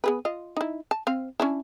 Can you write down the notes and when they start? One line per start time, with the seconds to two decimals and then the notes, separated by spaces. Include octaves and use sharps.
0.04 B3 G#4 B4
0.25 F4 D#5
0.57 D#4 E4
0.91 A5
1.07 C4 F5
1.40 C#4 D4 E4